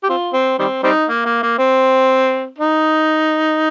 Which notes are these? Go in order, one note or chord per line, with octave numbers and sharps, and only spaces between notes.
G4
C4 F4
C4
D#3 G3 C4
G3 C4 D#4
A#3
A#3
A#3
C4
D#4